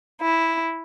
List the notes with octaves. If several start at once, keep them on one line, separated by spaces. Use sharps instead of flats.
E4